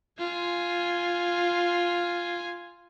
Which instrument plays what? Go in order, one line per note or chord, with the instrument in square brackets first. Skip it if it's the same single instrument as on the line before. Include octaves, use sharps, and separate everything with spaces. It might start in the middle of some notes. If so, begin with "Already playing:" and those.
[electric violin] F4 G#5